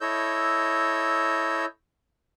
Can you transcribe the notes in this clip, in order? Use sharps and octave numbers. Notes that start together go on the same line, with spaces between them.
E4 A4 C#5 D#5 E6 G6